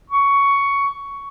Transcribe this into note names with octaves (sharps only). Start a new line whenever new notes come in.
C#6